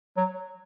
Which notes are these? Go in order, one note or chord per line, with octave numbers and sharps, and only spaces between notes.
F#3